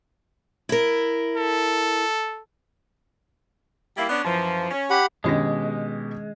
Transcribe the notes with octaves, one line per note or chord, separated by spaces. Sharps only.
E4 A#4
A4
G3 A#3 E4
B3 C#4 D4
F#2 E3 F3
C#4
G4 F#5 B5
B2 D#3 G#3 C#4 D4 G4 A#6